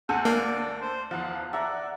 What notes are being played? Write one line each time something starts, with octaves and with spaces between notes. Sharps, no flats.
D2 A4 F#5 G#5 G6
A#3 D5
C5
E2 F3 F#5
D5 E5 F#5 A#5